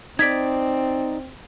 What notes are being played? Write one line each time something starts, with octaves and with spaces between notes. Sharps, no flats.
C4 D#4 D5 G#6 B6